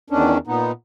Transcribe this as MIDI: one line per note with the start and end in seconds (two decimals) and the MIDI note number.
0.10 0.38 40
0.10 0.38 51
0.10 0.38 61
0.10 0.38 62
0.47 0.72 46
0.47 0.72 59
0.47 0.72 63